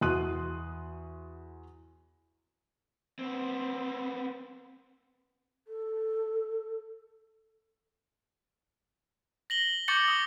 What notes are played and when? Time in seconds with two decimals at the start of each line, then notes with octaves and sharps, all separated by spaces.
0.01 E2 F#4 C6 D#6 F#6 D#7
3.19 B3 C4
5.67 A4
9.50 A#6 F#7 G7
9.88 C#6 D6 G6 A6 C#7 F#7
10.08 C#6 D#6